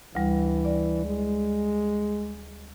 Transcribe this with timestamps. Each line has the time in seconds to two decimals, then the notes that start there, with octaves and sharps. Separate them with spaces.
0.15 D2 E3 G3
0.65 D5
1.05 G#3